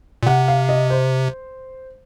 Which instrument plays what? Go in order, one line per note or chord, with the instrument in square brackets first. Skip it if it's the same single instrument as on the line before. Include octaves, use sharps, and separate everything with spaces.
[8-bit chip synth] A#2
[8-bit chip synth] C3 [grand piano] F#5
[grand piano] F5
D#5
C5